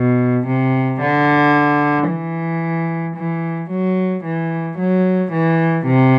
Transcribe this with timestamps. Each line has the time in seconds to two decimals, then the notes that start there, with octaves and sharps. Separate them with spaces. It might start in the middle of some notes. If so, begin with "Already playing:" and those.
Already playing: B2
0.47 C3
1.01 D3
2.09 E3
3.16 E3
3.70 F#3
4.24 E3
4.78 F#3
5.32 E3
5.86 C3